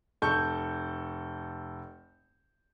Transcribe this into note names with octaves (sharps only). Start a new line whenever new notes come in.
F1 A4 C#6 G6